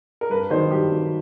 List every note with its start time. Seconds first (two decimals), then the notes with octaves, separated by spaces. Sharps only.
0.21 A#4
0.30 G2 B4
0.50 D#3 C5
0.54 F#3
0.71 G2 G4
0.92 D#3 F#3